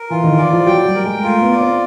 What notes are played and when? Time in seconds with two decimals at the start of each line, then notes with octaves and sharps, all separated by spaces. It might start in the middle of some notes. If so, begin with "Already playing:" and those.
Already playing: A#4
0.10 E3 F4
0.24 D#3
0.38 E3 D5
0.53 F3
0.66 F#3 G5
0.85 G3
0.95 A#4
1.04 G#3
1.23 A3 F4
1.41 B3
1.52 D5
1.61 C4